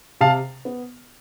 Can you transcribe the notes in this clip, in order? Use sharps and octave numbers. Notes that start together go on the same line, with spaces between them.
C3 F5 A5
B3